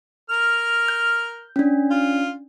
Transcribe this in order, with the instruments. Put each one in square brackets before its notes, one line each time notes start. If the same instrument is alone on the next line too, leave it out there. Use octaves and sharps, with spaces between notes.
[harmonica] A#4 F6
[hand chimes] G6
C#4 D4
[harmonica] F4